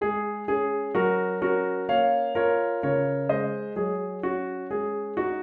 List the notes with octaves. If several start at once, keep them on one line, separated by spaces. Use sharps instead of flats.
G#3 G#4
C#4 G#4
F#3 F#4 A#4
C#4 F#4 A#4
A#3 C#5 F5
F4 A#4 C#5
C#3 A#4 C#5
G#3 C5 D#5
F#3 G#4
C#4 F#4
G#3 G#4
D#4 F#4